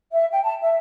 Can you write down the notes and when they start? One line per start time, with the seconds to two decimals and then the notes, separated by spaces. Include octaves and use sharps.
0.12 E5
0.30 G5
0.43 A5
0.60 E5